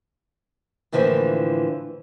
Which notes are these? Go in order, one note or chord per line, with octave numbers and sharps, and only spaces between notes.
A2 D3 E3 F3 A#3